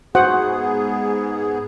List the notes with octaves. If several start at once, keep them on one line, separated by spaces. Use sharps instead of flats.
G#2 B3 F#4 G#4 C5 F#5